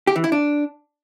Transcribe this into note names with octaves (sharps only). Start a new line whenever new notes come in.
G4
E3
E4
D4